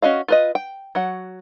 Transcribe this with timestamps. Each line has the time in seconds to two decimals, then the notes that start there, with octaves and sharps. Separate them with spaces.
0.02 C#4 F#4 D#5 F5
0.28 F4 B4 D#5
0.55 G5
0.95 F#3 F#5